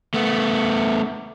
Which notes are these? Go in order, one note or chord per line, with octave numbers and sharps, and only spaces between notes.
A3 B3